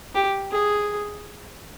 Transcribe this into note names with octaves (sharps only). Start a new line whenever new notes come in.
G4
G#4